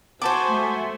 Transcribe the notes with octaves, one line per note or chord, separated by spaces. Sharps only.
B3 F#4 C5 G#5 A5 D6
A3